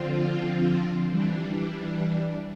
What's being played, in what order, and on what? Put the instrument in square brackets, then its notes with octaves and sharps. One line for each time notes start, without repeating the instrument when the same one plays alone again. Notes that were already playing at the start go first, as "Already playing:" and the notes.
Already playing: [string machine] D3 F3 C4 F4
E3 G3 D4